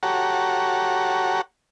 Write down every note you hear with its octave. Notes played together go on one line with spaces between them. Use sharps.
F#4 G4 A4 C#5 F#5 A#5